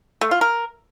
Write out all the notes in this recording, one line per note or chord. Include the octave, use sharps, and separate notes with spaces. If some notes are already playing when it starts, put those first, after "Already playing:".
A3
F4
A#4